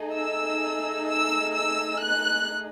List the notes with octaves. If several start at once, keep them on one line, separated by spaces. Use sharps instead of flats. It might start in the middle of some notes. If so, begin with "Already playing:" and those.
Already playing: A3 D#4 G#4
E6
E6
E6
F#6